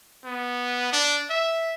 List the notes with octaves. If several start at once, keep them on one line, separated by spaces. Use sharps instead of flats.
B3
D4
E5